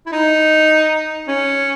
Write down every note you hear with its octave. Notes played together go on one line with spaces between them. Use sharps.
E4
D#4
C#4